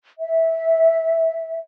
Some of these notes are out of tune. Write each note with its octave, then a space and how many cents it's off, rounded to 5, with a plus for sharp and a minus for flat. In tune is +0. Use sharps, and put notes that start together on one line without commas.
E5 -15